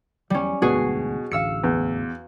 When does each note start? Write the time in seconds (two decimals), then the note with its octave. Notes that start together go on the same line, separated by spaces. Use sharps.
0.30 E2 G3 C#4
0.62 E1 D2 G#2 B2 F#4 G#4 C7
1.31 A1 D2 F5 E6 C#7
1.64 E2